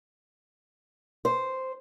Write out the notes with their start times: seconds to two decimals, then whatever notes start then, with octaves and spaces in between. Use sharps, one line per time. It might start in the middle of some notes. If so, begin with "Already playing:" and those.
1.25 C5